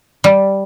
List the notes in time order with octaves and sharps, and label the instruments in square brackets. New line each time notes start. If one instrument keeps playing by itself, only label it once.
[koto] G3